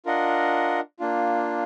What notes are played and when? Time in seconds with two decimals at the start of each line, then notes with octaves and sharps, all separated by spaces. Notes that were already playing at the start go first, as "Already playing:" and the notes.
0.06 D4 F4 A#4 D#5 F#5
0.99 A#3 D4 F4